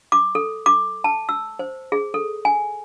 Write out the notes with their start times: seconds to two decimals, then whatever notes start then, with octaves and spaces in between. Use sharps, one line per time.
0.12 D6
0.35 A4
0.66 D6
1.04 A5
1.29 E6
1.59 C5
1.92 G#4
2.14 A4
2.45 G#5